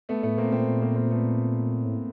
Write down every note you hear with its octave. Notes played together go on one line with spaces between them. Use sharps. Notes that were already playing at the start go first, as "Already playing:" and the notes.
A3 B3
A2 A3 B3
A#2 A#3 C4
A#2 A#3 C4
A#2
A#3 C4
A#3 C4
A3 B3
A2